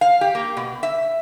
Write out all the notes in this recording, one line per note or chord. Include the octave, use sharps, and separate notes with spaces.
F5
G4
A#3
B2
E5